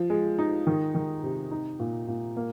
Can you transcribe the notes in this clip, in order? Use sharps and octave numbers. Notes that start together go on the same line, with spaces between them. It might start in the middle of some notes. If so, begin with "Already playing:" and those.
Already playing: F3
G#3
D#4
D#3
D#3
C3
D#4
A#2
A#2
A#3